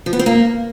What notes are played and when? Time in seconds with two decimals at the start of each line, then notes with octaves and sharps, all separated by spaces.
0.06 F3
0.13 B3
0.19 C4
0.26 A#3